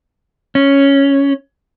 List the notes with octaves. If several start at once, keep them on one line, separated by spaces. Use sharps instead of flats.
C#4